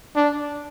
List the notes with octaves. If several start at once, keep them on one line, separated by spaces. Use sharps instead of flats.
D4